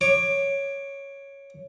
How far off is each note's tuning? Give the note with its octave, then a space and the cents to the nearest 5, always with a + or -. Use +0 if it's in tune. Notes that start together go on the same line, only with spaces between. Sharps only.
C#5 +0 D6 +15